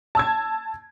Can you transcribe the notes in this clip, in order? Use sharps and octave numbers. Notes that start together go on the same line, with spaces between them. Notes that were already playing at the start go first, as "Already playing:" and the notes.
A5 E6 G#6